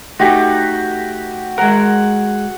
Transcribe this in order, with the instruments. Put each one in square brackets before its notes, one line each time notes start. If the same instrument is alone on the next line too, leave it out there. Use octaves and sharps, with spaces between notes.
[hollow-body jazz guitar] A3 D#4 [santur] F#4 G4
[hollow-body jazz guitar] G#3 A#4 [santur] F#5